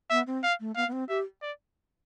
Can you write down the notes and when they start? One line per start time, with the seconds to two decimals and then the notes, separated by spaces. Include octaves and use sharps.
0.10 B3 E5
0.27 C4
0.44 F5
0.60 A3
0.76 B3 F5
0.88 B3
0.93 C4
1.09 G4 E5
1.42 D5